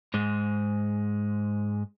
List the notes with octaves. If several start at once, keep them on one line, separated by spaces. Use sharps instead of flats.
G#2 G#3